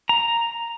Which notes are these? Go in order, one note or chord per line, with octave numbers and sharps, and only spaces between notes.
A#5